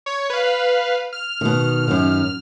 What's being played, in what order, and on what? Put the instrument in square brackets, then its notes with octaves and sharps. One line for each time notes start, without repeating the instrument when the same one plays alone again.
[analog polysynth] C#5
B4 F5
F6
[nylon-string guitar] B2 D#3
F#2 D#3